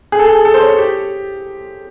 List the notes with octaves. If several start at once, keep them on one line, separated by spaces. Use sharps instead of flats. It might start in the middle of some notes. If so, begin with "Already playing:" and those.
G#4
A4
G#4
A4
C5
C#5
G4